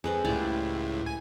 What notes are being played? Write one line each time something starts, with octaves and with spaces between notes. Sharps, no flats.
F2 G#3 B4 C5
C#2 A2 G3 E4 D5
G#5